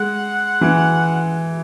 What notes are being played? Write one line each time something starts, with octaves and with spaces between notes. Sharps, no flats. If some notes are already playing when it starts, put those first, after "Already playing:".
Already playing: G#3 F#5
E3